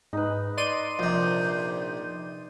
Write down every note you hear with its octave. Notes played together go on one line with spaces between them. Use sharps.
G#2 D#4 B4
D5 D#5 C6 D#7
A#1 C3 G6